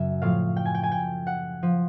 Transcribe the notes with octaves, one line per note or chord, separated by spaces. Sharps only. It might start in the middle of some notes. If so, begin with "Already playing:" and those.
Already playing: F#2 C#3 F#3 E5
A2 F3 F5
G5
G#5
G5
G#5
G5
F#5
F3